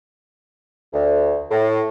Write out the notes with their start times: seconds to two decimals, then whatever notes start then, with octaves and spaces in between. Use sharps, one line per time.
0.93 D2
1.51 A2